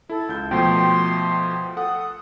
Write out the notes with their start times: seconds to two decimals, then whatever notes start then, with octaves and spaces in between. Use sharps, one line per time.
0.09 E4 A4
0.29 C#2 G6
0.51 B2 F3 A3 G5 C6
1.77 A4 F#5 D#6